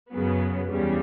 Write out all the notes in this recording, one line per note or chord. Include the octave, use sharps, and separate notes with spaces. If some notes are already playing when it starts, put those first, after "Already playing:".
F#2 C#3 F#3 B3
E2 C#3 G3